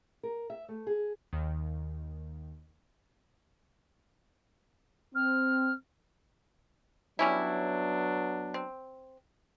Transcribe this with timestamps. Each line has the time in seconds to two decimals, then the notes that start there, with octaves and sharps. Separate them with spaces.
0.23 A#4
0.50 E5
0.68 A3
0.87 G#4
1.33 D#2 D#3
5.15 C4 F6
7.19 F#3 G3 B3 C#4 D4 E4
8.54 C4